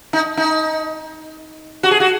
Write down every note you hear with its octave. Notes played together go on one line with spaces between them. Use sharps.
D#4
D#4
F#4
G#4
F#4